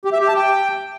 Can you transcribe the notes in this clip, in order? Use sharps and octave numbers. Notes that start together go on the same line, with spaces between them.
G4
E5
G4
A5
G5